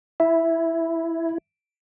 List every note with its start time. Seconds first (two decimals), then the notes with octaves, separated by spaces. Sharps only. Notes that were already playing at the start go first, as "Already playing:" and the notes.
0.20 E4 E5